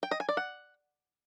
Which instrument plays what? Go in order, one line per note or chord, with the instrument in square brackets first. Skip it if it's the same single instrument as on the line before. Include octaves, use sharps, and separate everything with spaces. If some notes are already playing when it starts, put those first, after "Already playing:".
[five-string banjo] G5
D#5
G#5
D5
F#5